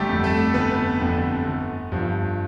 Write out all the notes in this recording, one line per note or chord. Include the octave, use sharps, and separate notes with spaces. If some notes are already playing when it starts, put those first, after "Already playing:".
Already playing: G1 G3 A3 G4 A4
F2 D3
A3 A4
G1 B3 B4
F2 D3
G1
G2 F3